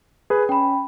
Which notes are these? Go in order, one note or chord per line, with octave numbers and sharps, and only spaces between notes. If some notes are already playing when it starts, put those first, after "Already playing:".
G#4 B4
C#4 G5 B5